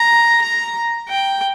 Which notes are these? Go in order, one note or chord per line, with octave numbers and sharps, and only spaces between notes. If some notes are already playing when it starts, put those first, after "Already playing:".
Already playing: A#5
A#5
G5